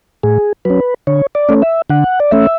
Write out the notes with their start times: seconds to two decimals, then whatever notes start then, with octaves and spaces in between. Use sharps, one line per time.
0.23 A2 G#4
0.65 F#3 C#4 B4
1.07 D3 C#5
1.35 D5
1.49 A3 C#4
1.62 E5
1.90 D3 F#5
2.20 D5
2.31 A3 C#4 E5